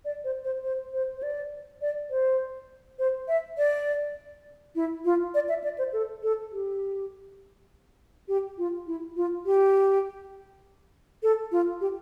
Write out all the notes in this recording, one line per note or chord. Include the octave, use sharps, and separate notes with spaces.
D5
C5
C5
C5
C5
C5
D5
D5
C5
C5
E5
D5
E4
F4
D5
E5
D5
C5
A4
A4
G4
G4
F4
E4
F4
G4
A4
F4
G4